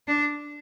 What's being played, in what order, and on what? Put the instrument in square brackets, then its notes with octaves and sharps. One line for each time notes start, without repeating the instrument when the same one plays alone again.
[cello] D4